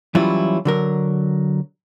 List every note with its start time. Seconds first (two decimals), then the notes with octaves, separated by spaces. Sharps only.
0.15 E3 F#3 G3 C#4 E4 F4
0.65 D3 F#3 A#4